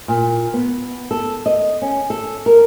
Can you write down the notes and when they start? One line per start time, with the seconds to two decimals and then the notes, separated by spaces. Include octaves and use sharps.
0.08 A#2
0.54 B3
1.11 A4
1.46 D#5
1.82 C#4
2.10 A4
2.46 A#4